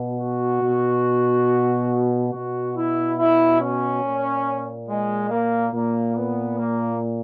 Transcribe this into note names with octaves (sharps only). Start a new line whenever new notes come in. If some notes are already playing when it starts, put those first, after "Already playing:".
Already playing: B2
F#4
B2
B2 F#4
E4
E4
C#4
A#2
G#3
A#3
A#2 A#3
B3
A#3